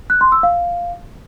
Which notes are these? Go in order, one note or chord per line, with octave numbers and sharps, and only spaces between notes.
F#6
C6
E6
F5